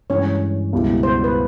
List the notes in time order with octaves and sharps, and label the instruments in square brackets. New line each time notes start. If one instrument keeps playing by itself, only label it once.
[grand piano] G2 E3 G#3 [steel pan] C#4 C#5
[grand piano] C#2 B2 G3 B3 E4
[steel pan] C5
B4